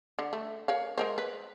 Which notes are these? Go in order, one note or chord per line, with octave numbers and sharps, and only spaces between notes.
D3
A3
A#4 C#5 F5
G#3 A#4 C5
B4